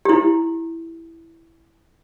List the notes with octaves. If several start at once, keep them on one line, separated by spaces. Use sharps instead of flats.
E4 G4